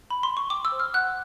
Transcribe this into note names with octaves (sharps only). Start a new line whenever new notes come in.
B5
C6
C#6
G5 D6
E6
C5
F6
F#5 F#6